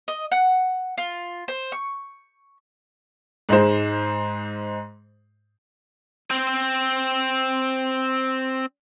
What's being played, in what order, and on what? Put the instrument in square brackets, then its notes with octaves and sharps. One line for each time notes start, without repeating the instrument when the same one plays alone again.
[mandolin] D#5
F#5
F4
C5
C#6
[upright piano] G#2 G#3 D#4 C5
[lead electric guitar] C4 C5